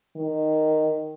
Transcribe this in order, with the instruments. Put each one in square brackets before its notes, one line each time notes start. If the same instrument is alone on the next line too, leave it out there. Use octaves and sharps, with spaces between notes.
[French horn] D#3